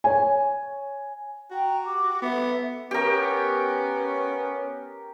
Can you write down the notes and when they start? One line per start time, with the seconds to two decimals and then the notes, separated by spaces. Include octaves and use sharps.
0.04 C#5 G#5
1.51 F#4 G5 A#5
1.84 G4 D6
2.22 B3 A4 E5
2.91 B3 C#4 G4 A#4